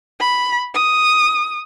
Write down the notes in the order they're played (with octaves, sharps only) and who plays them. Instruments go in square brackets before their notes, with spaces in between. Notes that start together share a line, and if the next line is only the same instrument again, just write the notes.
[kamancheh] B5
D#6